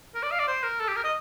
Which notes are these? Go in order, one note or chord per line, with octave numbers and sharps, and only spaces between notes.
A#4
D5
F5
D5
C5
A#4
A4
G4
A#4
D#5